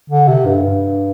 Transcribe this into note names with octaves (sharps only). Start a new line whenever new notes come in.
D3
C3
G2
G2